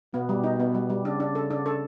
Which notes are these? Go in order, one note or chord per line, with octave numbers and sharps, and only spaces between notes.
B2 B3
G3
D#4
B3
G3
G3
C#3 D4
D4
A4
D4
A4